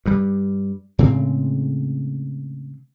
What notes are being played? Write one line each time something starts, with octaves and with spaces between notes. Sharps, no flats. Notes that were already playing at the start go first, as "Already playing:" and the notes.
G2 G3
A2 C#3 G#3 C4